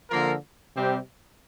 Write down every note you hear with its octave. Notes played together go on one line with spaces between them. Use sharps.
D3 F3 A#3 F4 A#4
C3 G3 C4 G4